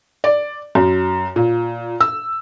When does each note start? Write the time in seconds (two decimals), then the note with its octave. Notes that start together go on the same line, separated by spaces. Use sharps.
0.24 D5
0.75 F#2
1.36 A#2
2.01 E6